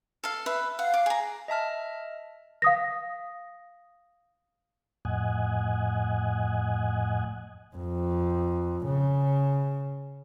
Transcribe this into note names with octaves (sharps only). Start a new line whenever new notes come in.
A4 F5
B4 E5
F5 F#5
D6
G#4 A#5
D#5 E5 A5 F6
F5 D#6 A#6
F2 A2 D#5 F#5 G#5
F2
C#3